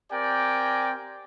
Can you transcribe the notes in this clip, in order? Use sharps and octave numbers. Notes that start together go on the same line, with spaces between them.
C4 G4 A#4 D5 G5 G#5